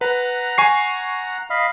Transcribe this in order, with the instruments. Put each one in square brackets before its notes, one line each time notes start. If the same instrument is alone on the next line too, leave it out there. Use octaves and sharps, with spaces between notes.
[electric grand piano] B4 [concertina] F#5 A#5
[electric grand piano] G#5 C#6 C7
[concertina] D#5 F5 B5